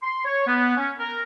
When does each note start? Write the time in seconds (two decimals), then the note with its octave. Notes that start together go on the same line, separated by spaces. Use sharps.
0.03 C6
0.25 C#5
0.47 B3
0.77 C#4
0.99 A#4